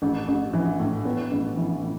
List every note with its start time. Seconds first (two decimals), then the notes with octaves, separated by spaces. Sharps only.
0.02 A1
0.28 A1
0.53 E3
0.80 A2
1.05 B3
1.31 A1
1.57 E3
1.83 A2